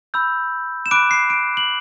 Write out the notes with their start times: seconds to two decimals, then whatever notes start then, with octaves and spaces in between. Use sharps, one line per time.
0.14 B5 E6 G6
0.86 E7
0.91 B5 D6 F#6 D7
1.11 C7
1.30 D7
1.57 F#7